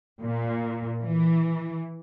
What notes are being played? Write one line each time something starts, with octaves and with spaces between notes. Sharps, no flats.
A#2
E3